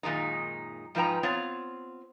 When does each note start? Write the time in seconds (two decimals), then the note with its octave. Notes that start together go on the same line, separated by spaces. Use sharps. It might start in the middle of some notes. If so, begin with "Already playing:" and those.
0.03 F#2 A#2 D#3 G#3 D#4
0.95 G#2 F3 D#4 B4 G5 A#5
1.23 B3 C4 F4 C#5